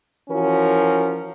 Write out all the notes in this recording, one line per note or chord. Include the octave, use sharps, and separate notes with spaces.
E3 F3 C#4 F#4 A#4